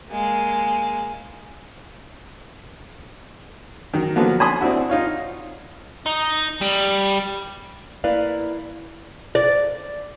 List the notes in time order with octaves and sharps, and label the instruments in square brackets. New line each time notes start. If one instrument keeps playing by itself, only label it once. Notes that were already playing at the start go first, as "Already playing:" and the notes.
[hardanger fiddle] G#3 A#3
[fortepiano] D#3 F#3
D3 F3 F#3 A#3 B3
C#5 G#5 A5 B5 C6 D#6
C4 D4 E4 F#4
D#4 F4 C#5
[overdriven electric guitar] D#4
G3
[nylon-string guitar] A#3 E4 B4 D5 F5
[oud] D5